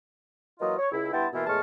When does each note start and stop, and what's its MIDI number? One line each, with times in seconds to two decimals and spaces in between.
0.60 0.75 52
0.60 0.75 54
0.60 0.75 58
0.60 0.75 65
0.60 0.75 75
0.79 0.92 73
0.92 1.09 37
0.92 1.09 64
1.13 1.27 43
1.13 1.27 59
1.13 1.27 64
1.13 1.27 79
1.13 1.27 81
1.13 1.27 84
1.33 1.46 47
1.33 1.46 52
1.33 1.46 58
1.33 1.46 64
1.33 1.46 65
1.33 1.46 70
1.47 1.61 40
1.47 1.61 45
1.47 1.61 56
1.47 1.61 81
1.47 1.61 85
1.47 1.61 89